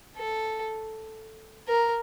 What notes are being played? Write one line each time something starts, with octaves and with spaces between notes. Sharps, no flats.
A4
A#4